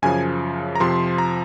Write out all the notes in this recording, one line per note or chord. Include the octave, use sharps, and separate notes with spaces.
F#2 C#3 F3 G#5
A#5
F2 C3 F3 C6
A#5